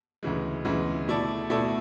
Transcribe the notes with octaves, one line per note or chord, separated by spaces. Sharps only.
D2 C#3 E3 G#3
D2 C#3 E3 G#3
B2 A3 E4 A4 D5
B2 A3 E4 A4 D5